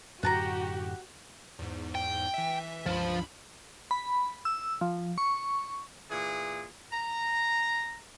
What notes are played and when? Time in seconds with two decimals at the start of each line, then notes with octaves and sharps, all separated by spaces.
0.23 F#2 A2 D3 F#4 G4 F#5 A5 A#5
1.59 E2 G#2
1.95 G5
2.34 E3 E5
2.86 C#2 G2 F3 B5
3.91 B5
4.45 E6
4.81 F3
5.18 C#6
6.11 A#2 E3 G#4
6.93 A#5